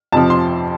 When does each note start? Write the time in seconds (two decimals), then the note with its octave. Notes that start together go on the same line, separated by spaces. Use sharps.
0.12 F2 C3 F3 A5
0.30 C6